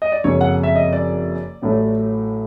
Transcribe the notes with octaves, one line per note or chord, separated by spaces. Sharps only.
D#5
D5
F#1 F2 C#3 C#5
F#5
E5
D#5
D5
A1 A2 F#3 A3